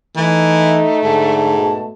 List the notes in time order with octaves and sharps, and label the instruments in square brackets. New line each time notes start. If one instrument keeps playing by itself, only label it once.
[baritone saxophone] E3 [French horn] A3 [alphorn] D#4
[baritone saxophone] G#2 [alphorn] D3 [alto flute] A5
[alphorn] B2